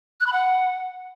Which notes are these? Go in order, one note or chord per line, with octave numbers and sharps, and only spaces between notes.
F#6
B5
F#5